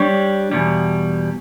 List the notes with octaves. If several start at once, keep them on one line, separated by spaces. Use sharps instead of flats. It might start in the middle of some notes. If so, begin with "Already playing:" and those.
Already playing: G3 D4 G4 C#5
E2 B2 G3